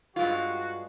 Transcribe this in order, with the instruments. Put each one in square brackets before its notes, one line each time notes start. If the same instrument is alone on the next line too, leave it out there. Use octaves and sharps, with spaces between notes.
[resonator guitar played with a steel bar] G2 G#3 F4 [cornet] F#4